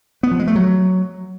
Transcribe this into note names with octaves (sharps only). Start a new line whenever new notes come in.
B3
F3
G#3
A3
F#3